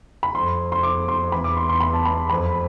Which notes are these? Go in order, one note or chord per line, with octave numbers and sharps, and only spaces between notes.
B5
F2 C6
C6
D6
C6
E2 B5
D6
C6
C6
B5
A5
B5
F2 B5